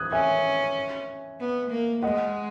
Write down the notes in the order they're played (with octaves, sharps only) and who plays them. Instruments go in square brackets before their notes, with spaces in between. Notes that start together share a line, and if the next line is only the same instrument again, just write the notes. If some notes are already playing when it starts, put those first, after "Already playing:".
Already playing: [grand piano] D#6 F#6 G#6
[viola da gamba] C#4 [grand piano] E5 G#5
[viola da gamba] B3
A#3
[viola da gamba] G#3 [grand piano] D#5 F#5